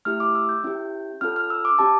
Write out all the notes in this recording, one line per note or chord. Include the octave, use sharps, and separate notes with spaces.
A3 E4 G4 F6
D6
E6
G6
C#4 E4 G4
C#4 F4 A4 F6
F6
E6
D6
C#4 G4 A5